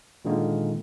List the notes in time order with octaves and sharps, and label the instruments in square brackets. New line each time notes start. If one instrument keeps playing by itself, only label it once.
[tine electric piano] A#2 D3 D#3 G#3 A#3